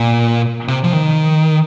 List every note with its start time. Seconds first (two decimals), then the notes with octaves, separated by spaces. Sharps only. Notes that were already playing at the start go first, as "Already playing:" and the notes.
Already playing: A#2
0.68 C3
0.84 F3
0.93 D#3